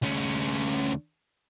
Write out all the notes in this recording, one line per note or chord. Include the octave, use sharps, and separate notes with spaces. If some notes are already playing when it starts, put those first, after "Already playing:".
D2 C#4